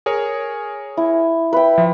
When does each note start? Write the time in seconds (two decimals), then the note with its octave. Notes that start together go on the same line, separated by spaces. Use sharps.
0.06 G#4 A#4 C#5
0.97 E4
1.53 B4 E5 G5
1.78 F3